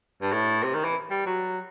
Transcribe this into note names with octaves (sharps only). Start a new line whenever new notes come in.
G2
A2
C3
D#3
E3
G3
F#3